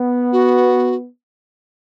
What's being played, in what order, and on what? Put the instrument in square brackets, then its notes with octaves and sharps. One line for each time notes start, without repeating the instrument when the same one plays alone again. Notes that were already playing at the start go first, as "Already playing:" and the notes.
Already playing: [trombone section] B3
[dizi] F#4